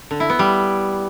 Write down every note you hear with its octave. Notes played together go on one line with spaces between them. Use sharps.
D3
E4
B3
G3